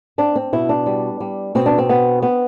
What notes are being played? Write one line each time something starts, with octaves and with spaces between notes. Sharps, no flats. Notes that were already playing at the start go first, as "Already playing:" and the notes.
C4 D4
C4
B2 E4
D4
G3
G3
B2 C4
D4
C4
B3
B3